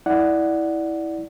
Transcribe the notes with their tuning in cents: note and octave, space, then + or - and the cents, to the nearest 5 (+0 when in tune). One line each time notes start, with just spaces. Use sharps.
E4 -15 D5 +0 F#5 +0